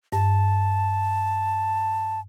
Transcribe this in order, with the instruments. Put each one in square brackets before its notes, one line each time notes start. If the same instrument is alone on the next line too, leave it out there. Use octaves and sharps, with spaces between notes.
[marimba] G2 [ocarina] A5